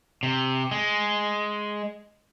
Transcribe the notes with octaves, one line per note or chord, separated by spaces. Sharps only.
C3
G#3